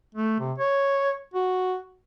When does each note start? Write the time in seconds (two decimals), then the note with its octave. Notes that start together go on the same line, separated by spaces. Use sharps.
0.15 A3
0.40 C3
0.58 C#5
1.34 F#4